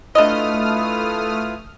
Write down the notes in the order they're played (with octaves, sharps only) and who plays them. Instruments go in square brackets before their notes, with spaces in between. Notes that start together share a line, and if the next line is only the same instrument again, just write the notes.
[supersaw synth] A3 D#6 F6 [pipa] D4 D#5 [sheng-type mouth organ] E4 F4 B4